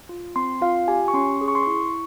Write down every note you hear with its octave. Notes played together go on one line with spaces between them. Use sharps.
F4
C4 C6
F4 F5
G4 G#5
C#6
C#4 C6
G#4
C#6
C6
E4 C#6